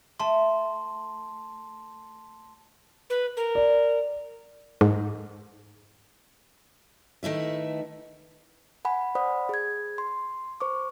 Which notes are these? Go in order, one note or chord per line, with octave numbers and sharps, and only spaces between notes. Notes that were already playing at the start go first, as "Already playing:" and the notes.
A3 A5 C6
B4
A#4
D5
G#2
D#3 A3 E4 B4
F#5 G#5 B5
C5 D5 F#5 B5 D#6
G#4 G#6
C6
C5 C#6 D6